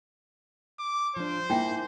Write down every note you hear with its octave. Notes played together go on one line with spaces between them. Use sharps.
D6
F3 D4 C5
A#3 D#4 E4 G5